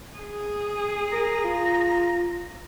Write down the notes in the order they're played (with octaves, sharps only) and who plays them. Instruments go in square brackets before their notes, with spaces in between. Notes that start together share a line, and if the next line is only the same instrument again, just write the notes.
[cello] G#4
[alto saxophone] A#4 [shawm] A#5
[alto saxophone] F4